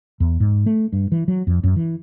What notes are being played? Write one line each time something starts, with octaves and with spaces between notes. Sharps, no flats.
E2
G#2
A3
G2
E3
F#3
F2
F#2
E3